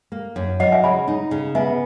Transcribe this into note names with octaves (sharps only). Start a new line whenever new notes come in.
A#3
F#2
F#3 D#5 F#5
E5 G#5
C#3 G#5 B5
D#4
C#3
B3 E5 G#5